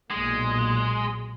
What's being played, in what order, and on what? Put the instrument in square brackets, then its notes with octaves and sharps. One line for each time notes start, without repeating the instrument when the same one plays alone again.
[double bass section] B1 A#2 [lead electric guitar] G#3